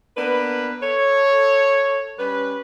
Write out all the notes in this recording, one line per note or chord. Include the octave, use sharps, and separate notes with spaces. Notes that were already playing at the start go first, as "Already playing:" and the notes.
A#3 B3 D4 B4
A4 C#5
G3 C#4 B4